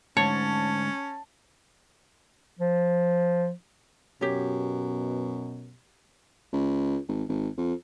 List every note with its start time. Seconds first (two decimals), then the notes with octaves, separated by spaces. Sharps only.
0.17 D2 G#2 C#4 C#5 A5
2.59 F3
4.21 F#2 B2 G4 C#5
6.53 C#2
7.08 G#1
7.29 G#1
7.57 F2